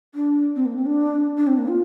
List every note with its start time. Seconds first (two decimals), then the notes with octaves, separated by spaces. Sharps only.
0.15 D4
0.56 C4
0.66 A#3
0.76 C4
0.86 D4
1.37 D4
1.47 C4
1.58 A#3
1.68 F4